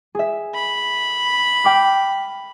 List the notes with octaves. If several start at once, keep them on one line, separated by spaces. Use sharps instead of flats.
G#4 E5
B5
G5 D6 F6